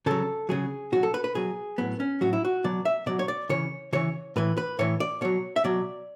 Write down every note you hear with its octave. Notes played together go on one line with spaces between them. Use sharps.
C#3 F#3 A4
C#3 F#3 G#4
B2 F#3 F#4
A4
B4
B4
B2 F#3 G#4
A2 F#3 B3
C#4
A2 F#3 F#4
E4
F#4
B2 F#3 D5
E5
B2 F#3 D5
C#5
D5
C#3 E3 C#5
C#3 E3 C#5
A2 E3 B4
B4
A2 E3 C#5
D5
B2 F#3 C#5
E5
B2 F#3 D5